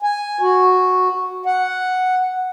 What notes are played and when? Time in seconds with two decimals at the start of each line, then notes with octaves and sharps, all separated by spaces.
0.02 G#5
0.41 F#4
1.46 F#5